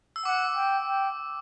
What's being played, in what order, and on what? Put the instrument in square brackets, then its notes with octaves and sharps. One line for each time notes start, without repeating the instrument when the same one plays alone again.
[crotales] E6
[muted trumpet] F#5 [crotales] D6
[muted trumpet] G5
G5